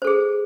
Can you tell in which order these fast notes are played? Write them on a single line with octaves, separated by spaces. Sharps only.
C5 A4 G#4